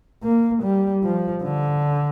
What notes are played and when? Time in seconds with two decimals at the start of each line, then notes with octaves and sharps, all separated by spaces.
0.23 A#3
0.63 G3
1.03 F3
1.44 D3